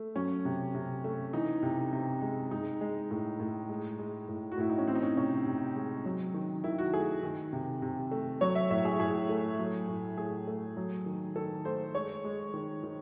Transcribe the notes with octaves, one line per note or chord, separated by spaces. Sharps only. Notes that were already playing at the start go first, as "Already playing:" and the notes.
Already playing: A3
F#3 C#4
C3
C3
A3
E3 D#4
C3
C3
G#3
G#3 D#4
G#3
A2
A2
G#3
G#3
A2
F#4
A2 E4
D#4
C#4
E3 C4
D#4
C#4
C3 C#4
C3
G#3
F#3
D#3
D#3 E4
F#4
A3 G#4
D#3
C3
C3
A3
F#3 C#5
E5
A2 E5
G#4
A2 G#4
A3
F#3
A2
A2 G#4
A3
F#3
D#3
D#3 A4
A3 C5
G#3 C#5
G#3
D#3
D#3